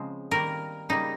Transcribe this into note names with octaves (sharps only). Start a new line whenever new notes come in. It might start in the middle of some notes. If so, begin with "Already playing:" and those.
Already playing: C#3 F3 G#3 C4
D#3 G3 A#3 A#4
C#3 G3 A#3 D#4